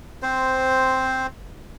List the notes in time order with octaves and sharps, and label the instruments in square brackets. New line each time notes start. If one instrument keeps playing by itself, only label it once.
[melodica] C4 C5